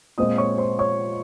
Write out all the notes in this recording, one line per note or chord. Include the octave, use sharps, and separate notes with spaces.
A#2 G#3 C4 F4 D#5 D#6
C#5 C#6
C5 C6
C#5 C#6